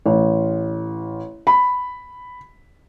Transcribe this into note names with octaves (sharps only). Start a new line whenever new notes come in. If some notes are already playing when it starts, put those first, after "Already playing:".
A1
B5